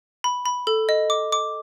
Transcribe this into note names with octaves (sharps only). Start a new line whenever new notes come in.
B5
B5
A4
D#5
D6
D6